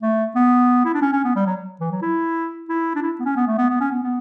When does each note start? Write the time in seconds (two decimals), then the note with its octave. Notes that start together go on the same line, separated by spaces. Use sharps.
0.02 A3
0.35 B3
0.85 E4
0.94 D4
1.02 C#4
1.13 C#4
1.24 B3
1.36 G3
1.46 F#3
1.80 E3
1.91 F#3
2.02 E4
2.69 E4
2.95 D4
3.02 E4
3.20 B3
3.25 C#4
3.36 B3
3.47 A3
3.58 B3
3.70 B3
3.81 C#4
3.91 B3
4.03 B3